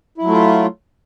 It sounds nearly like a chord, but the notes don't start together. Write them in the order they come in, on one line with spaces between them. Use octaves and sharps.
E4 F#3 A3 F4